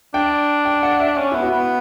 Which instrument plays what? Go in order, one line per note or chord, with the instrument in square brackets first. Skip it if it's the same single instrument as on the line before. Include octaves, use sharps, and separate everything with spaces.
[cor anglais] D4 [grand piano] G5
[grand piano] G5
F#5
E5
[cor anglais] C#4
[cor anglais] B3 [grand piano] E4
[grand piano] F#4
[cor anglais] B3